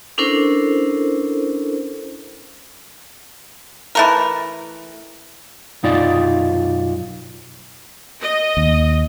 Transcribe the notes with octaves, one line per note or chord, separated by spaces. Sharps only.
C#4 D4 E4 A4 A#4 C5
E3 A3 A#4
B1 F#2 D#4 F4 D5
D#5
D#2